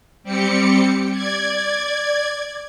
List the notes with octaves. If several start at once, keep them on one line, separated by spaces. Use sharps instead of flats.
G3 C4 G4 C#7
D5 G#6